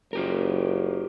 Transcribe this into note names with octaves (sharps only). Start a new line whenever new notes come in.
F#1 F4 G4 A#4